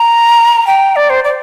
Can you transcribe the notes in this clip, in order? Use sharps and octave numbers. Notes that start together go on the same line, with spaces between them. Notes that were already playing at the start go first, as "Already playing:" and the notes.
Already playing: A#5
G5
D5
C5
D5